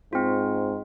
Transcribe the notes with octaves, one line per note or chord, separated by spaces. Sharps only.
G#2 C4 F4